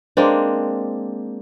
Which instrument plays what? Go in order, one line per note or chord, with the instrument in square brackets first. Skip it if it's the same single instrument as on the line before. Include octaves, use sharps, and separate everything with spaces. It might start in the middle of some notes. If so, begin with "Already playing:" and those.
[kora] G#3 A#3 C4 D4